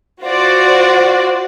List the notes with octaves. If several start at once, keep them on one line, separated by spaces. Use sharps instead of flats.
F4 F#4 C5 D5